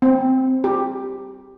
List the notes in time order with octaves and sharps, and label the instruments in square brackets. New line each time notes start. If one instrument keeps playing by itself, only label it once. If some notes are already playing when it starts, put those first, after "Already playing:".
[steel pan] C4
G4